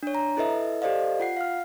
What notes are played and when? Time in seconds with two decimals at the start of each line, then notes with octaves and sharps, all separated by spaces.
0.03 D4 C#5
0.15 A#5
0.37 E4 A4 B4 D#5 E5
0.82 G4 A4 C5 D5 D#5 F5
1.20 F4 F#5 C7
1.37 F5 F6